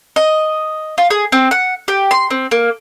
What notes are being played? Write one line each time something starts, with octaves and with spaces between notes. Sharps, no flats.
D#5
F4
G#4
C4
F#5
G4
C6
C4
A#3